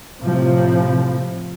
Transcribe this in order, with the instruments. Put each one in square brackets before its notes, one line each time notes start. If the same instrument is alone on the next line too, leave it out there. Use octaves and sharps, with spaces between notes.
[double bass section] A2 C3 F3